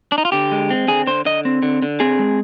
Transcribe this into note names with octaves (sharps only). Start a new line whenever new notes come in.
D4
D#4
F4
D3 G4
G#3
C4
D3 G#4
D3 C5
D3 D#5
C4
D3
D3
C4 G#4
G#3